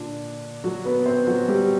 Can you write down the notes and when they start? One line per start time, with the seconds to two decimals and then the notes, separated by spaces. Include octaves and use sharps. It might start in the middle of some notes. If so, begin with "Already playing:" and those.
Already playing: A#2 D3 D4
0.64 F#3 F#4
0.85 B3 B4
1.06 C4 C5
1.27 F#3 F#4
1.48 G3 G4